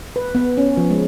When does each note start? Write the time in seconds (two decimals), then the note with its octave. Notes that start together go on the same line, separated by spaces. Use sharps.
0.16 B4
0.35 B3
0.58 C#4
0.77 F3
0.90 G#3